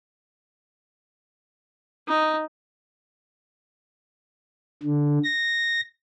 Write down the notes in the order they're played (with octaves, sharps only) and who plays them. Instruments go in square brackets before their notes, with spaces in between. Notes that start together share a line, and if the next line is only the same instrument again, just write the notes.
[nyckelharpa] D#4
[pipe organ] D3
A#6